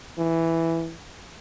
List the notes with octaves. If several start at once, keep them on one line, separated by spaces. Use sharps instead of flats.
E3